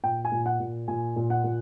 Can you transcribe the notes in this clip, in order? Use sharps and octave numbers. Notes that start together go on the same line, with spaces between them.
A#2 G5
G#5
A#2
F#5
A#2
A#2 G#5
A#2
F#5
A#2